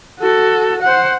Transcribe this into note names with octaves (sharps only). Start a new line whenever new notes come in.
F#4 A4
C5 F#5